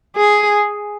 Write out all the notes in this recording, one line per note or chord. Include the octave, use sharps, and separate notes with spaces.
G#4